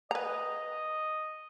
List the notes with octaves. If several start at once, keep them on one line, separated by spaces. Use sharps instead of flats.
B4 D#5 A#5